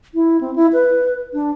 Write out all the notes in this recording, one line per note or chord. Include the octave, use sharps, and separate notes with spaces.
E4
C4
E4
B4
D4